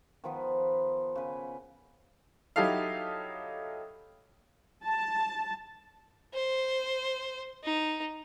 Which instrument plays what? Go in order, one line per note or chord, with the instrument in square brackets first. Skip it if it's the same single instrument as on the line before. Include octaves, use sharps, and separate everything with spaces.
[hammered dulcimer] D#3 F3 B3 B4
C#3 B4
[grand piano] F#3 D#4 E4 G4 A4 F5
[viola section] A5
[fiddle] C5
D#4